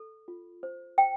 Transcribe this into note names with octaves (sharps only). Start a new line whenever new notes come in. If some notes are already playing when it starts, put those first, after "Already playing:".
Already playing: A4
F4
C5
C5 G5